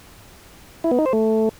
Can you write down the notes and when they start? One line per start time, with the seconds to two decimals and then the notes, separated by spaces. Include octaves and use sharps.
0.84 E4
0.91 B3
0.99 D#4
1.06 C5
1.13 A3